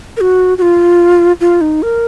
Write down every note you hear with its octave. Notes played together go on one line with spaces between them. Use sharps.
A#4
F#4
F#4
F4
F4
D#4
A#4